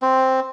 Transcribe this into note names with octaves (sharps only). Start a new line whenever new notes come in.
C4